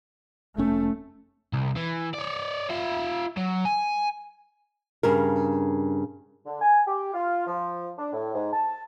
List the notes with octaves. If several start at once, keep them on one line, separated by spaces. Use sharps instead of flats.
F1 A3 C#4
C2
E3
C#5 D5
F4 E5
F#3
G#5
G2 C#3 A#4
D3
G#5
G4
F4
F3
D4
A2
G#2
A5